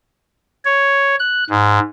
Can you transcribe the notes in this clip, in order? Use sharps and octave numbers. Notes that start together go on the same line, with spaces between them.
C#5
F#6
G#2